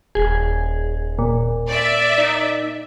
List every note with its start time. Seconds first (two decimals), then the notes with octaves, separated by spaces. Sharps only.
0.15 D#1 G#4
1.19 A#2
1.67 D5 E5
2.18 D#4